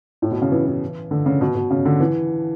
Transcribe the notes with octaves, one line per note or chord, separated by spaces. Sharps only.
A2
B2
C#3
E3
E3
D3
C#3
B2
B2
C#3
D3
E3